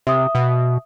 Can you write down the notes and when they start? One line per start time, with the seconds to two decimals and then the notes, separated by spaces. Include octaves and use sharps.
0.07 C3 E5 D#6
0.35 B2